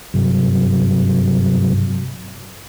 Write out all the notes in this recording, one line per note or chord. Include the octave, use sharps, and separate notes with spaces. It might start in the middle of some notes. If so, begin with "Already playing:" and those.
G2 C3 F#3